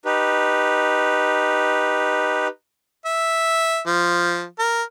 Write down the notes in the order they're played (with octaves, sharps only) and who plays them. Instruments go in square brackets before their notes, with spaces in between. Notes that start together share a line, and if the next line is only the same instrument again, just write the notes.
[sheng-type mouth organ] D#4 G4 B4
[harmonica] E5
F3
A#4